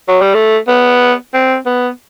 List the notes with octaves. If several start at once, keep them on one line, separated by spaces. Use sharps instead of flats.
F#3
G3
A3
B3
C4
B3